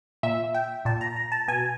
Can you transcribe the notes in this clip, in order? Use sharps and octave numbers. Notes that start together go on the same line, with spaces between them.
A#2 E5
G5
A#2 A5
A#5
A#5
A5
B2 G#5